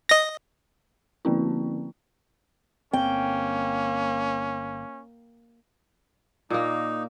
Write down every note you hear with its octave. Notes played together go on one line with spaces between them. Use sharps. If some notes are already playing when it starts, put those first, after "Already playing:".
D#5 A#6
D3 F3 A#3 C4 C#4 E4
G1 A#3 C4 C#4 G5
A#2 A#3 D#4